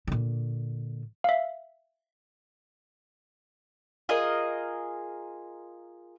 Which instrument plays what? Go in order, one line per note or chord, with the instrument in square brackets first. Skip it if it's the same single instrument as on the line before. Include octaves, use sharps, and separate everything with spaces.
[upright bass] A#2 D3
[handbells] E5 F5
[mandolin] F4 G#4 A#4 D#5